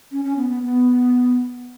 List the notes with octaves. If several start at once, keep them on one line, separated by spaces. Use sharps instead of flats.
C#4
C#4
B3
B3
B3